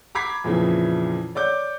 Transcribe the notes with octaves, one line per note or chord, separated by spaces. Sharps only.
A#5 B5 D6 G#6 B6 C7
F2 A#2 C#3 E3 F3
C#5 D5 D6 G6